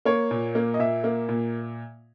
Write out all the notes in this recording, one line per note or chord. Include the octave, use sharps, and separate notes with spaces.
A#3 C#5
A#2
A#3
D#5
A#2 E5
A#3
A#2